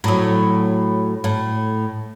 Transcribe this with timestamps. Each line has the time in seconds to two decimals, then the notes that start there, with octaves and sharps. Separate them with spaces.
0.04 A2 F#3
1.24 A2